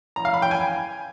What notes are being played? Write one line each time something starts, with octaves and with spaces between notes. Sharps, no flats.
A#5
F5
B5
G5
G#5